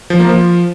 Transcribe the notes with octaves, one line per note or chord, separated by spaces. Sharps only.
F3
A#3
F3